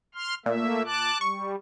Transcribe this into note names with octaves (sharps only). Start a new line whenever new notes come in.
C6 F6
A#2 A3 A#3 E5
A5 D6 F#6
G3 C#6